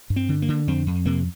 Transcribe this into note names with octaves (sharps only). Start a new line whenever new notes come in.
G2
C4
D3
A#3
D3
F2 C4
F2
C3 A#3